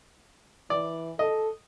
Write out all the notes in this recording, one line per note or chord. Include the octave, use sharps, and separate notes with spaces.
E3 D5
A4 D#5